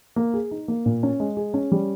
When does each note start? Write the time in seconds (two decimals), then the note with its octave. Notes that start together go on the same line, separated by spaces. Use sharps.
0.16 A#3
0.34 G#4
0.51 D#4
0.68 A#3
0.86 A#2
1.03 C#4
1.20 G#3
1.37 G#4
1.54 C#4
1.72 G3